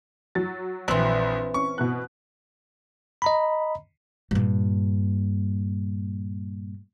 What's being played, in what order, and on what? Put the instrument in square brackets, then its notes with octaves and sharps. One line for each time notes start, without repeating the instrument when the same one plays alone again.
[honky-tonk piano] F#3 A6
[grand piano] A#1 [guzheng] E3 C4
[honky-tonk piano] C#4 [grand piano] C#6
[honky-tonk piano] B2 B3 F#6
[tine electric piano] D#5 A#5 B5
[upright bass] G2 A#2